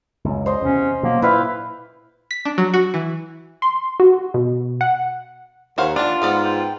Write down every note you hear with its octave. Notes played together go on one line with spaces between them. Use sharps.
C#2 F#2
C5 D#5
E2 C3 C#4
B2 F#3 A#3
A#2 E4 B4 F5 G5
B6
D4
F#3
F#4
E3
C6
F#4
B2
F#5
D#2 C5 C#5 F5 F#5
D4 F4 D5 A5
G#2 B3 B4 D5
G5